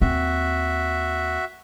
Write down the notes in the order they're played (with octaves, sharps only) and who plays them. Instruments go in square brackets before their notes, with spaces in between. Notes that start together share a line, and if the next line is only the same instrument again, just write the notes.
[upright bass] D#2 C4 [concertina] F#4 E5